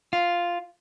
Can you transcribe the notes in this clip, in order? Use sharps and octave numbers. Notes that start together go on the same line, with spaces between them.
F4